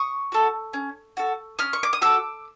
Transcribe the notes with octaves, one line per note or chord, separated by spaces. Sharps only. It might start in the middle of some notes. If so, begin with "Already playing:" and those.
Already playing: C#6 D#6
F#4 A4
C#4
F#4 A4
C#4 D#6 F6
C#6
D6
D#6
F#4 A4 D6 E6